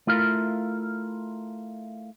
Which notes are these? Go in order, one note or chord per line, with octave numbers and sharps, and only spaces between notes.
A3 E4 F4 A#4 F5